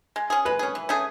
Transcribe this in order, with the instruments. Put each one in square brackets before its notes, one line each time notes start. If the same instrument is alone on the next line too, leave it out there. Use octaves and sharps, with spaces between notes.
[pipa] G#3
C#4 G#4
[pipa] G#3 [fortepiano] B4
[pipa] C#4 G#4
E3
A3 C#4 G#4